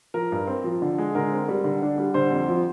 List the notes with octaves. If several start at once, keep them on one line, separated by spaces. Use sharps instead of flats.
F3 A#4
G2
C4
F3
D3
G#3
D3 A#4
C4
G3
D3
D4
G3
D3 C5
F2
F3